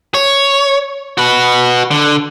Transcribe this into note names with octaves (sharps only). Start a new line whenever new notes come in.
C#5
F#4 B4
D3